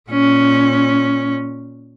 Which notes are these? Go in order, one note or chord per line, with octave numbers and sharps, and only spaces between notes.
A#2 C#4